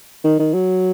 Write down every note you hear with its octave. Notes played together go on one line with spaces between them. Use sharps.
D#3
D#3
F#3